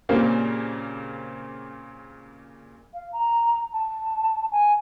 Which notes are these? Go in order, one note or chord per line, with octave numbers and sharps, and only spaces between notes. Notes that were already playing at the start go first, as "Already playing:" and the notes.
A#2 C#3 G3 A#3 C4
F5
A#5
A5
G#5